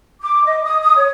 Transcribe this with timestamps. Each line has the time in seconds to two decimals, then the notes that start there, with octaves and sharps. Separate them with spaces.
0.21 D6
0.44 D#5
0.63 D#6
0.81 D#6
0.96 C#5